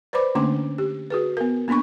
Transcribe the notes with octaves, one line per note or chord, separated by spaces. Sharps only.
B4 C5 D5 B5 D6
D3 A3 A#3 C#4 D4 D6
G4
F#4 G#4 B4
B3 A#4
A#3 B3 D4 B5 C#6